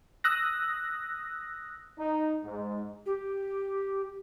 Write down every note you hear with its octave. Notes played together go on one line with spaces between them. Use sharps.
D#6 E6 F#6 A#6
D#4
G#2
G4